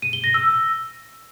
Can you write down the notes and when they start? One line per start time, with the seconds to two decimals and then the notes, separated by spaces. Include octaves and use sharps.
0.02 D#7
0.13 G7
0.24 A#6
0.34 E6